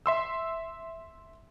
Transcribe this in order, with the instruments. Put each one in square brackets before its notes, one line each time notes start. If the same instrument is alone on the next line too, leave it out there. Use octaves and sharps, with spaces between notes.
[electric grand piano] E5 C6 E6